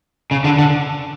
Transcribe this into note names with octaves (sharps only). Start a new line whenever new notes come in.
C#3
D3
D3